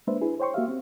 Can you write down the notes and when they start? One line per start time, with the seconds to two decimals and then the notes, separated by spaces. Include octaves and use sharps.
0.07 G#3 A#3 D4 B4 C5 E5
0.21 D4 E4 G#4 B4
0.40 C5 C#5 G5 C6 C#6
0.54 A#3 F#4 G4 E5 F5
0.68 C4